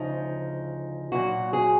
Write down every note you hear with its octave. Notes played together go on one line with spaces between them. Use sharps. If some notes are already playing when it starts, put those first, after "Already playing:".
Already playing: D2 C#3 F3 D#4
A#2 F#3 F#4
G#4